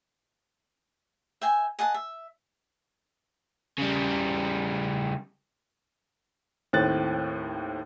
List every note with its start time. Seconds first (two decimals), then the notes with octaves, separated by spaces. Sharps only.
1.41 E5 G5 G#5
1.79 G#4 D#5 F#5 A5
1.94 E5
3.78 C#3 G3
6.73 D#2 A2 C4 F#6 A6